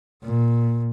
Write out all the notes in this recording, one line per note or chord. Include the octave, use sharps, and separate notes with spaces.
A#2